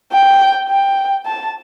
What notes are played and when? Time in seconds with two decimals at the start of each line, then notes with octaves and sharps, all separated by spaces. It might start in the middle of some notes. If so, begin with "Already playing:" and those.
0.12 G5
0.69 G5
1.26 A5